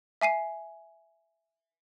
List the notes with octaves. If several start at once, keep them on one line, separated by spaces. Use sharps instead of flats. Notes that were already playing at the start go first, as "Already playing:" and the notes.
E5 G#5 C7 D#7